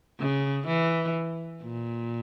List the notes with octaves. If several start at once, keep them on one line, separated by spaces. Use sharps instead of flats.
C#3
E3
A#2